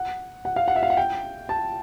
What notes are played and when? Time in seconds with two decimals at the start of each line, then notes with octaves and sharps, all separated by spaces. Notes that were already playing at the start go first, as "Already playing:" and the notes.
Already playing: F#5
0.45 F#5
0.56 F5
0.68 F#5
0.76 E5
0.83 F5
0.90 F#5
0.97 G5
1.49 A5